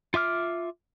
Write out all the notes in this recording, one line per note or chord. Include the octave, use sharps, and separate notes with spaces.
F4 E5 D6 F6